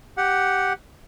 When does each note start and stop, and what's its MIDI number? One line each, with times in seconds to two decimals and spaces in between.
0.17 0.73 67
0.17 0.73 78